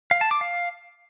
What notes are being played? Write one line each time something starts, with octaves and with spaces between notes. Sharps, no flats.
F5
A5
D6
F5